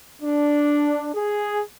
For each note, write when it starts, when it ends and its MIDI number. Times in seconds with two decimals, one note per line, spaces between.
0.22 1.09 62
1.14 1.61 68